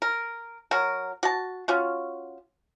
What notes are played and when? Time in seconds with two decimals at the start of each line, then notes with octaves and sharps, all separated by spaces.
0.02 A#4
0.71 F#3 F#4 A#4
1.23 F#4 A5
1.68 C#4 F4 F#4